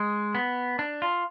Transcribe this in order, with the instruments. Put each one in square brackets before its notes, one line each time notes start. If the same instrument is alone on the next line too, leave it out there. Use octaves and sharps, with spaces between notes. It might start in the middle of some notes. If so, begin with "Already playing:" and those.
Already playing: [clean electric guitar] G#3
B3
D4
F4